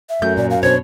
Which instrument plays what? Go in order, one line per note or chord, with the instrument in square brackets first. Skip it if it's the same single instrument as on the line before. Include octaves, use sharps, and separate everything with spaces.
[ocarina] E5
[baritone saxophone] F#2 [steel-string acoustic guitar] A3 [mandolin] G6
[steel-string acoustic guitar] A#2 [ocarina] D5
[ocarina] F5
[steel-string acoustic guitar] B2 D4 [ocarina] C5 [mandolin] C#5